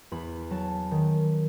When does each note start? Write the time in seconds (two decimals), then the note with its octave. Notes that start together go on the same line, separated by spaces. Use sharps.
0.11 E2 B5
0.51 F#3 A5
0.91 D#3